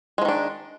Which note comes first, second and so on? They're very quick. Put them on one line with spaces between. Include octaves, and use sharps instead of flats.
G#3 F3 D#3 D4